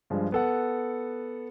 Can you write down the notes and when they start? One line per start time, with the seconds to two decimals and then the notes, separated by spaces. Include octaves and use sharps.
0.10 G2 F3 G#3
0.32 B3 A4 F#5